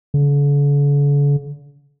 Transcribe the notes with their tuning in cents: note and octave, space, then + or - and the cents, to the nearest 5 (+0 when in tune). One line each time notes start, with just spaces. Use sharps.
D3 -45